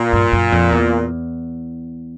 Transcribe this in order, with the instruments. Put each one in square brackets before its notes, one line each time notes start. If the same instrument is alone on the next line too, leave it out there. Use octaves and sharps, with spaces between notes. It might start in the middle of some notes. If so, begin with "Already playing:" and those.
Already playing: [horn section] A#2
[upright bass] G2
F#2
F2
E2